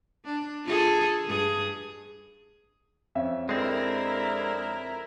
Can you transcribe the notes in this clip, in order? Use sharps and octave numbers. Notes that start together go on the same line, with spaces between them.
D4
F4 G#4 A4
G2 G#4
F2 C#4 E5
D3 G#3 C4 E4 A#4